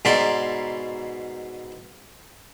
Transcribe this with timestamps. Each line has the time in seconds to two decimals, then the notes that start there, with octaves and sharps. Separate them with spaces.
0.05 G#2 B2 D5 A#5 C6